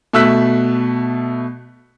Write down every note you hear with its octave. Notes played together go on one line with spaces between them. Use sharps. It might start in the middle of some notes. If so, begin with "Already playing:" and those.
B2 A3 E6 F#6 B6